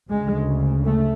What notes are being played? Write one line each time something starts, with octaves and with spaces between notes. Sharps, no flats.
D2 C#3 G#3
A3